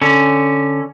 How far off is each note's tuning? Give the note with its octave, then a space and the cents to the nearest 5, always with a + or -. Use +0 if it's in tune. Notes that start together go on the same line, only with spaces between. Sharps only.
D3 +0 C#4 +0